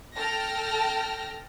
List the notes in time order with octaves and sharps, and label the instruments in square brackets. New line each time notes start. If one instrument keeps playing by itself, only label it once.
[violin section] A4 G5 A5 F6 A#6